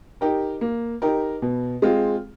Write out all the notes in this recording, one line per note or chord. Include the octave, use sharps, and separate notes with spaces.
D#4 G4 A#4
A#3
D#4 G4 A#4
B2
G#3 C4 F4